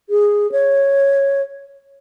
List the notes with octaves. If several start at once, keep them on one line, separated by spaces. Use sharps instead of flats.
G#4
C#5